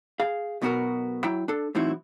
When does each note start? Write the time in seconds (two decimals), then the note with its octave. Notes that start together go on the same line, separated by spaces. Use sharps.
0.20 G#4 F5
0.61 B1 B2 B3 D#4 F#4 A#4
1.23 F#3 E4 G5
1.48 D4 A4
1.75 A2 E3 F#3 C4 D#4 E4